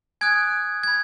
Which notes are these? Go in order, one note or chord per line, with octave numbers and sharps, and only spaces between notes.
G#5 D#6 F#6 G#6
G#6
B5